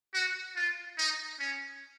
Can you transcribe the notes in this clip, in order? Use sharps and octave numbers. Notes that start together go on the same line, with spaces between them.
F#4
F4
D#4
C#4